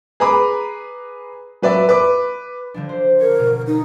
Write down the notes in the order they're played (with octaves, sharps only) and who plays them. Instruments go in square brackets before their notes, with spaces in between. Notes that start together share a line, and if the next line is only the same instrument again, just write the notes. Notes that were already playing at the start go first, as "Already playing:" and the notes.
[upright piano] G#4 B4 A#5 B5 D6
F#3 B4 D5 E5
B4 D6
[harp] D3 F3 D4
C5
[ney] A#4 [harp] C#5
[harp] B2
[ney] D#4